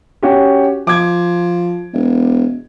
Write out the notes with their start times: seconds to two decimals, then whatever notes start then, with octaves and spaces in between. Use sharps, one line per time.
0.23 C#4 F#4 G4
0.87 F3 D6 G#6
1.94 E1